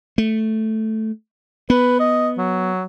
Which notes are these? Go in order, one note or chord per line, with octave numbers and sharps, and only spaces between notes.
A3
B3 B4
D#5
F#3